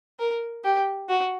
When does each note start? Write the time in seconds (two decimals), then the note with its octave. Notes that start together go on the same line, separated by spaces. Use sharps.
0.19 A#4
0.64 G4
1.09 F#4